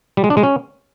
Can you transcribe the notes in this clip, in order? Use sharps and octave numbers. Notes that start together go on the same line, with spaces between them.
G3
G#3
D4
G#3
C#4